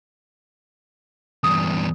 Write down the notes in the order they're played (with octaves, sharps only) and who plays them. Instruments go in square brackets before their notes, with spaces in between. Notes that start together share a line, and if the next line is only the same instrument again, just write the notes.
[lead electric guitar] E2 G2 [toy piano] D#6